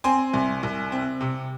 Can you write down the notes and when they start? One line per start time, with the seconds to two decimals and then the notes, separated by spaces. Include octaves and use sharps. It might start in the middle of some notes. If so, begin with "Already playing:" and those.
0.04 C4 G#5 C6
0.33 C2
0.63 C2
0.92 C4
1.21 C3